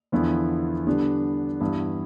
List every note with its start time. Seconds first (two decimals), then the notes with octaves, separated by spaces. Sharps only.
0.12 E2 D3 F3 B3 E4
0.87 D3 G3 B3 D4
1.60 G2 E3 B3 E4